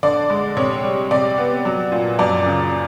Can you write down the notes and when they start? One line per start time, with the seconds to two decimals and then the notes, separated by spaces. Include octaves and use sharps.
0.03 D3 D5
0.30 G#3
0.57 C3 C#5
0.84 G3
1.11 C3 D5
1.38 B3
1.65 F#3
1.92 A#2
2.19 F#2 D5
2.46 C#3